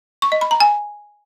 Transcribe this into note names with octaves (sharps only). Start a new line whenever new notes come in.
C#6
D#5
B5
A#5
G#5